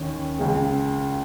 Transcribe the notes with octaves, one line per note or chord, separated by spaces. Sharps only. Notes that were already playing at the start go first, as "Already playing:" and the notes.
Already playing: D#2 D#3 C#4
C#2 C#3 G#3